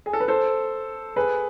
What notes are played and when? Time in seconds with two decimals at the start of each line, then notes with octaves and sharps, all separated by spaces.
0.06 G#4
0.13 A4
0.20 B4
0.28 A4 C5
1.16 G#4 B4